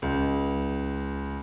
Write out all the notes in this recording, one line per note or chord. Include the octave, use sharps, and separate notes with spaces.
C#2